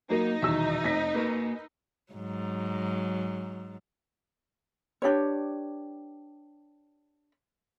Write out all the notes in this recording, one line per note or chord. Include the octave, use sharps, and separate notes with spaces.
F#3 A#3 B3 D#4 F#4 A#4
D#1 E2 B2 E5 E6
F1 A#6 B6
A#3 F#4 A#4 B4
G#2 F#3
D4 G4 B4 C#5